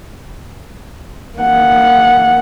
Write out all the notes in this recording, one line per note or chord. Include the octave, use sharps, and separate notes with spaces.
A#3 F#5